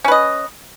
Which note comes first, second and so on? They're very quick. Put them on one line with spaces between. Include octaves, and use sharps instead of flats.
C#4 B4 D#5